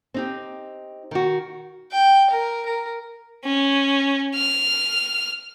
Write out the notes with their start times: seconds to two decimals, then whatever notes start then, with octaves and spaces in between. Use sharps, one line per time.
0.14 C4 D#4 G4
1.11 D#3 F#4
1.92 G5
2.31 A#4
2.66 A#4
3.45 C#4
4.35 F6